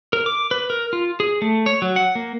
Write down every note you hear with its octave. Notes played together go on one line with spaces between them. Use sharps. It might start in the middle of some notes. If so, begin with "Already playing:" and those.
A#4
D6
B4
A#4
F4
G#4
A3
C#5
F#3
F#5
A#3